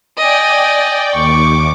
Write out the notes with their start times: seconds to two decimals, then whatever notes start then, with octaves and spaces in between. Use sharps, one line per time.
0.18 D5 D#5 G5 G#5
1.13 D#2 C#6 D6